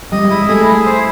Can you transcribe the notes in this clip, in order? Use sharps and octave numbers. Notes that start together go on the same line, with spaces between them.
G3 D#5
G#3
E4
G3
A3 G#4
E4
C5